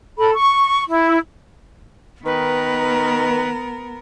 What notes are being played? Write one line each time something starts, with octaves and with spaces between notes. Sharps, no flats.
A4 B5
C#6
E4
D#3 B3 A#4 B4